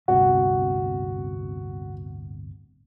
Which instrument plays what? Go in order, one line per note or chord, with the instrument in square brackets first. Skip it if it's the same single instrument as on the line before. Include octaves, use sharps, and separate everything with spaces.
[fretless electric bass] D1 G1 C3 [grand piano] F#4